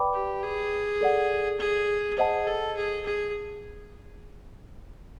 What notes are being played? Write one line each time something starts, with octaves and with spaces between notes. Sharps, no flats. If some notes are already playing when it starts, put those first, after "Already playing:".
Already playing: B4 D5 G5 B5 D6
G4
G#4
A4 D5 F#5
G#4
G#4 C5 D#5 F#5 A5
A4
G#4
G#4